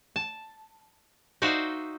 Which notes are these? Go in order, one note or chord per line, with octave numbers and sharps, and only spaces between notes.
A5
D#4 F#4 C5 D5 E5 F5